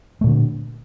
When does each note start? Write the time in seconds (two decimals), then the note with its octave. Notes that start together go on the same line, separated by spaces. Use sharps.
0.21 A3
0.24 A#2
0.27 D3